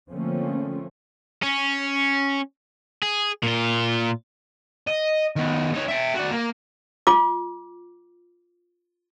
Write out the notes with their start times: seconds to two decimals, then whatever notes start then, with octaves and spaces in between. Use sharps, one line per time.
0.11 D3 F3 A3 A#3 C4 C#4
1.43 C#4
3.03 G#4
3.43 A#2 F4
4.87 D#5
5.36 D#3 B3
5.74 D#4 C#5
5.88 E5 G5
6.15 F#4 D5
6.31 A#3
7.07 F4 D6